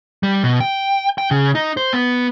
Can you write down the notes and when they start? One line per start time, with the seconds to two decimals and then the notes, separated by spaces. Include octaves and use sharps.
0.23 G3
0.44 B2
0.60 G5
1.18 G5
1.31 C#3
1.55 D#4
1.77 C5
1.93 B3